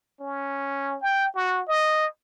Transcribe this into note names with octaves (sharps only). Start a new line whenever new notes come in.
C#4
G5
F#4
D#5